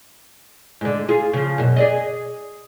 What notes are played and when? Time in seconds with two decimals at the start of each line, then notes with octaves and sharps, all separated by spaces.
0.81 G#2 D3
1.09 F4 G#4
1.33 C#3 F3
1.58 F#2 B2
1.76 G#4 D5 D#5